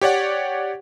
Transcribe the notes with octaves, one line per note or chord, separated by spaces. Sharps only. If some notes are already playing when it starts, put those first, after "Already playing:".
G4 C#5 D5 F#5